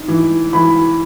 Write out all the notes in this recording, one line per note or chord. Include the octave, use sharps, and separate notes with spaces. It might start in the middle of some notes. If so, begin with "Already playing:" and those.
Already playing: D#4
E3
E3 B5